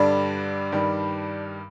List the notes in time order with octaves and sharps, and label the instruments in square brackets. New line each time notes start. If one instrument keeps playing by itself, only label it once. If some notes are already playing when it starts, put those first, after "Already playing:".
Already playing: [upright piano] G2 D3 G3 D4
G2 D#3 G3